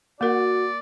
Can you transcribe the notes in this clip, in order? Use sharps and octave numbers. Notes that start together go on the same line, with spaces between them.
A#3 F#4 A#4 D5